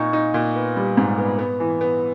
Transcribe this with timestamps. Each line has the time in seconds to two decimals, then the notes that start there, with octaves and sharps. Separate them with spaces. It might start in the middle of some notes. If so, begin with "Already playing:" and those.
Already playing: A#2 D#4 C#6
0.13 D#4
0.34 A#2
0.55 B3
0.77 G3
0.97 G#2
1.18 B3
1.39 B3
1.60 E3
1.81 B3